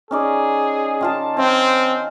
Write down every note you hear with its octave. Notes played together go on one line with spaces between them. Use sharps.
C#4 D#4 G#4 D5
D#3 F4 A5
C4 F5 G#5